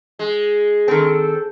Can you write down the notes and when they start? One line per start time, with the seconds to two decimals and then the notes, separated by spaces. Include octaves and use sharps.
0.19 G#3
0.88 D#3 C4 A4